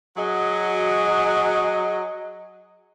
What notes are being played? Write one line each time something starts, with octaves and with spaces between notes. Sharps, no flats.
F#3 F#4 G#4 D#5